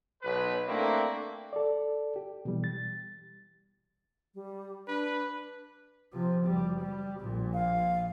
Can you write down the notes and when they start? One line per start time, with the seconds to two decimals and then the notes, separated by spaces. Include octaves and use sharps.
0.23 B1 B4
0.67 A3 A#3 C4 D4 E4 F#4
1.53 A4 D5
2.16 G4
2.45 B2 E3 G3
2.64 A6
4.35 G3
4.88 D4 B4
6.12 C3 F3
6.46 F#1 G3
6.81 G3
7.20 A#1 A#2
7.54 F5